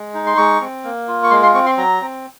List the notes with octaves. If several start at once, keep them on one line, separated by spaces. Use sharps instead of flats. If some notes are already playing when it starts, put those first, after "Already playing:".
Already playing: G#3
D#4
C6
G#3 C#6
C4
A#3
F4
C#6
G#3 C6
C6
C4 C#6
C6
F#3 A#5
C4